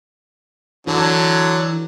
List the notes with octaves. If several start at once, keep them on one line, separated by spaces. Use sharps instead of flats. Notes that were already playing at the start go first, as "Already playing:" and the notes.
D3 E3 F#3